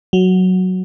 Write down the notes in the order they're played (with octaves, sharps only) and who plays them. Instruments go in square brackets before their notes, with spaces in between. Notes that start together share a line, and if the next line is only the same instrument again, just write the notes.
[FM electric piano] F#3